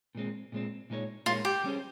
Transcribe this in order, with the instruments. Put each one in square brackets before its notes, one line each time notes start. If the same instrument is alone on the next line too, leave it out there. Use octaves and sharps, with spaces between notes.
[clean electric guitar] A#2 G#3 C4
A#2 G#3 C4
A#2 G#3 D#4 A#4 C#5
[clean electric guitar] A#2 G#3 D#4 A#4 C#5 [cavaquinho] F4
[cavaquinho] G4
[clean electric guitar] G3 C#4 G#4 C5